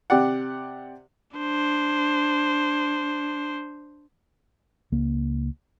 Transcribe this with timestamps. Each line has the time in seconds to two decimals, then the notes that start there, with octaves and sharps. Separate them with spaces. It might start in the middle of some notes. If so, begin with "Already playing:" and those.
0.10 C3 G4 D5 F#5
1.37 D4 C5
4.92 C#2 A#3